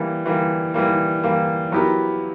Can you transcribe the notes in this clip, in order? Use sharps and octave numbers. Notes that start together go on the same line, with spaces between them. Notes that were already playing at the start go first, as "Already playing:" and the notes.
Already playing: E3 G3 A#3
E3 G3 A#3
E3 G3 A#3
E3 G3 A#3
F#3 B3 E4 G4 A#4